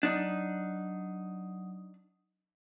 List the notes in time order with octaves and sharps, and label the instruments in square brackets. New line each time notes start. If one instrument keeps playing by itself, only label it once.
[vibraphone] F#3 D#6 [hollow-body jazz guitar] D4 D#4